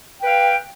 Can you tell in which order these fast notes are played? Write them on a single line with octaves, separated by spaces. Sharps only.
G5 B4 F5